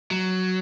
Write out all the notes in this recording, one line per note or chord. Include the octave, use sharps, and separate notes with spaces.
F#3